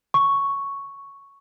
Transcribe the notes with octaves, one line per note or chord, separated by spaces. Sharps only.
C#6